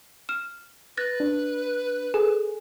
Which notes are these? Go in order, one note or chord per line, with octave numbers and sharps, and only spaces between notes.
F6 E7
B4 F#6 A6 A#6
D4
G#4 A4